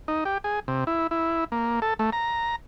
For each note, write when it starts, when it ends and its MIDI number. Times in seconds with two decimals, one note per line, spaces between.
0.08 0.24 63
0.25 0.38 67
0.44 0.60 68
0.68 0.84 48
0.87 1.07 64
1.11 1.44 64
1.52 1.80 58
1.82 1.94 69
1.99 2.10 57
2.12 2.56 82